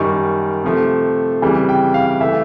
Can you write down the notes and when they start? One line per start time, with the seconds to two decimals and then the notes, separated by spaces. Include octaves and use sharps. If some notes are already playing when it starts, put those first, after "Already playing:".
Already playing: F#2 D#3 G3 C#6
0.64 C3 F3 A3
1.42 F2 C#3 E3 G3
1.69 G5
1.94 F5
2.21 E3 A3 E5